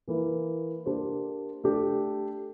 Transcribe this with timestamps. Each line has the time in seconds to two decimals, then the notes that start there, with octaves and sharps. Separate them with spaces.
0.08 E3 A#3 E4
0.86 A#3 D4 G4 C5
1.64 A3 D4 G4